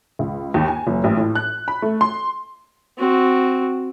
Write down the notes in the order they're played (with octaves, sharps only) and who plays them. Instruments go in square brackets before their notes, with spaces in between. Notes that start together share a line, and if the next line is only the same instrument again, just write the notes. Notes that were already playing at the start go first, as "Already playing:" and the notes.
[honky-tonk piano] C#2
D#2
G#5
F#1
A1
A2
F#6
B5
A3
C6
[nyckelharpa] C4 F#4